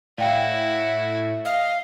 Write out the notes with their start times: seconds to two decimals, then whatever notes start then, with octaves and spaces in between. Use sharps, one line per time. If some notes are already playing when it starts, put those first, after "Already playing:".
0.18 A2 E4 F#4 D5 F5 G5
1.45 D#5 F5